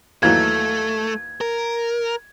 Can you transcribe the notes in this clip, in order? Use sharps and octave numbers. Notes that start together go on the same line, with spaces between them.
D#2 E3 F#3 A3 G#6
A#4